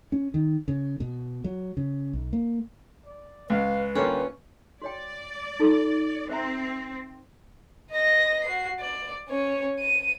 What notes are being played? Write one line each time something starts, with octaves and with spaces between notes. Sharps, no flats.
C#4
D#3
C#3
B2
F#3
C#3
B1
A#3
D5
C#2 B4 F5
D3 G3 A#3 C#4 F4
F#4 C#5 D5 G5
D#4 F4 A4
C4 C5 E5 A#5
D#5 A#6
F#4 C7
D5
C#4 C#5
D#7